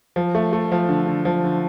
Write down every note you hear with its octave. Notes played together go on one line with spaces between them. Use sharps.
F3
A3
A3
F3
D3
D3
F3
D3